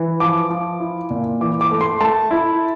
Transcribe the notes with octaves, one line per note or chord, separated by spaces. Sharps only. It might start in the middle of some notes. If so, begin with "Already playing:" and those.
Already playing: E3
F3 D6
F3
E4
A#2
E3 D6
D6
A3
C6
A3 A5
E4